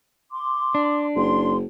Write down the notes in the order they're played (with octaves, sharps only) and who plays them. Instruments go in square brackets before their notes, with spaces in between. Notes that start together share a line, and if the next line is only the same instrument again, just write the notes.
[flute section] C6 D6
[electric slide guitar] D4
[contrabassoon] F#1 [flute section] C6